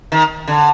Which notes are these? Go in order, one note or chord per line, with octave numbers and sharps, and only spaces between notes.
D#3
D3